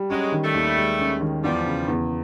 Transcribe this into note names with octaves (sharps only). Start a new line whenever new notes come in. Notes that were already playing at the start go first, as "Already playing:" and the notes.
Already playing: G3
F#3 G#3 C#4
D#3
G3 A3
D#2
G#3
C#4
D#3
E2 F3 G3
C#3
E2